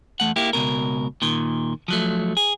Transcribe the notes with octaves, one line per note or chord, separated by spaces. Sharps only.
E2 A3 F#5
A#3 E4 G4
C#2 B2 A#4
A#2 D#3
F3 F#3 A3
G#4